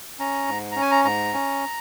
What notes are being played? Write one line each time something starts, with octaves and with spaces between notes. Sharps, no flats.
C#4 A#5
G#2
C#4 A#5
G#5
A#5
G#2 A#5
C#4